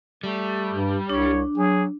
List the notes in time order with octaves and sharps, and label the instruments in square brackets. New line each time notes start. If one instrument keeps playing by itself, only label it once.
[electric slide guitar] G3 [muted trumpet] A3
[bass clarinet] G2
[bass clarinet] C2 [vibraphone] D4 [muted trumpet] C#5
[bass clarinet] F#3 [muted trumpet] G#4